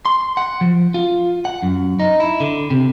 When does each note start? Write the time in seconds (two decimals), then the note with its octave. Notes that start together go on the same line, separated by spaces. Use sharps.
0.06 C6
0.37 F#5
0.61 F3
0.94 F4
1.45 F#5
1.63 F#2
2.00 D#4
2.20 E4
2.40 D3
2.70 C3